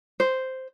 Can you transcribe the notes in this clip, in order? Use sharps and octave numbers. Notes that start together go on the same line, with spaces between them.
C5